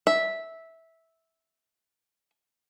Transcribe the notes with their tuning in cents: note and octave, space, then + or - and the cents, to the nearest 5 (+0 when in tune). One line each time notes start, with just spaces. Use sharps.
E5 -10